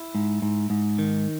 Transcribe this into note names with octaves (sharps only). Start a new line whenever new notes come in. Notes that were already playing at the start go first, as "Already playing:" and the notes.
Already playing: E4
G#2
G#2
G#2
D#3